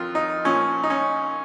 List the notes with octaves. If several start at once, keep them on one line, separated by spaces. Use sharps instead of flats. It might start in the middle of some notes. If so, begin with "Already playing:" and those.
Already playing: F2 D#3 F4
D#4
A#2 F3 C#4
D#4
C#4